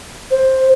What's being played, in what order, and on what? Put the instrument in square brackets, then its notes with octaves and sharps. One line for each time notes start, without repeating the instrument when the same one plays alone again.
[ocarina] C5